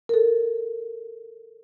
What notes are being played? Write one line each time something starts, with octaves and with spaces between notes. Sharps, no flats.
A4 A#4